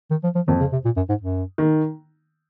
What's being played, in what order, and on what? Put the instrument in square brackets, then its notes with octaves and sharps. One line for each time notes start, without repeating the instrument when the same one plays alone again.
[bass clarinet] D#3
F3
F3
[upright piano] F2 [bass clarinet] D#3
[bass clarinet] C#3
C3
A#2
F#2
G#2
F#2
[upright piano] D#3